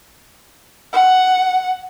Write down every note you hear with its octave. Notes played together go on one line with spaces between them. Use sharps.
F#5